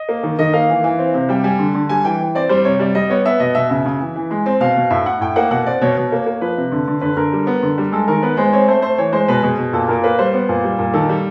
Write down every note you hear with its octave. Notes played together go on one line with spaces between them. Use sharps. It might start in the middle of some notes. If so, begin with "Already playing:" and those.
Already playing: D#5
A#3
D#3
D#3 D#5
A#3 F5
E3
E3
C4
C3
G3 G5
G3 G#5
D3
D3
G3 G#5
E3 G5
E3
C4 D5
G3 C5
C3 C#5
G3 D5
G3 D#5
B3 C#5
B3 E5
B2 D#5
B2 E5
C#3 E5
C#3
E3
E3
G#3
C4
B2 F5
B2
A2 E5
A2 F#5
A2 G5
A#3 F#5
B2 F#5
C4 D5
B2 C#5
B2
A#3
A#3
F3 B4
C3
D3
D3
D3 B4
D3 A#4
G3
B3
D3
G3
G#3 A4
D#3 A#4
B3 B4
G#3 C5
C4 C#5
A3 C5
A3 C5
E3 C#5
G#3 C5
B2 B4
B2 G#4
B2
A#2 A4
A#2 A#4
A#3 B4
G3 C5
B3
A#2
G3
A#2
D#3 A4
G3